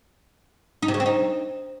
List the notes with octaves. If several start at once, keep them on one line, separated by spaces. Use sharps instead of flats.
D#4
C3
C#3
C4
D#4